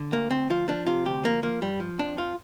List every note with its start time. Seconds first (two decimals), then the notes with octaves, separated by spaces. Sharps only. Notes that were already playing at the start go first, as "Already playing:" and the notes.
Already playing: D3
0.12 D2 A#3
0.31 D2 C4
0.50 F3 F4
0.68 F3 D4
0.87 C3 F4
1.05 D2 G4
1.24 F3 A#3
1.43 F3 A#3
1.62 G2 G3
1.80 F3
1.99 F2 D4
2.17 F3 F4